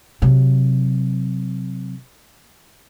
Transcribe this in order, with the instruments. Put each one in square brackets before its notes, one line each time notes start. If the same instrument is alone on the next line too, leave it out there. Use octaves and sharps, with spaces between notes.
[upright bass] C3 F#3